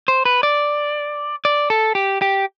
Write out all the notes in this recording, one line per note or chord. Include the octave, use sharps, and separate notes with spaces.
C5
B4
D5
D5
A4
G4
G4